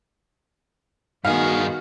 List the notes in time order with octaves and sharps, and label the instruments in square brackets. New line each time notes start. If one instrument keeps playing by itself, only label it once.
[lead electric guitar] G2 G#4 [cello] D#3 B3 [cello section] F#4 [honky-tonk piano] F5